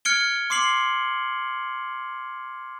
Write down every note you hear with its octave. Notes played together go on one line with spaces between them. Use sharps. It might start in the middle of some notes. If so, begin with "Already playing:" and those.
F6 G#6 C#7 D7 G7
C6 D6 C7 F#7